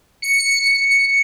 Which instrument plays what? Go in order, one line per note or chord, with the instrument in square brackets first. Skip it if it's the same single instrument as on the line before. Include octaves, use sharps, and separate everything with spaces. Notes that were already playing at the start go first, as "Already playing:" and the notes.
[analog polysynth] C#7